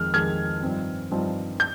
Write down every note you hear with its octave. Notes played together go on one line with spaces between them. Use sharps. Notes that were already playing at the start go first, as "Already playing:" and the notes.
Already playing: F2 D#3 G#3 F6
F2 D#3 G#3 F6 G#6
G2 F3 C4 D#4
G2 F3 C4 D#4
G6